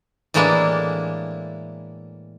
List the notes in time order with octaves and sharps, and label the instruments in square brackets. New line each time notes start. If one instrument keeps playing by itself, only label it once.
[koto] A2 E3 G#3 A#3 D4 E4